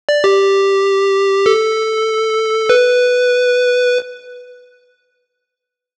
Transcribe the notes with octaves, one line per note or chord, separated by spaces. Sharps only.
D5
G4
A4
B4